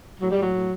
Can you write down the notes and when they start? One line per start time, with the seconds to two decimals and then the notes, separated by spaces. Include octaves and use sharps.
0.20 A2 F#3
0.31 G3
0.37 A2 F#3
0.54 A2